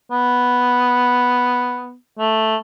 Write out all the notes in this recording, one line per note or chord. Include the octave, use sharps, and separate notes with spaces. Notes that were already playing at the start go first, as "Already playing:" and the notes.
B3
A3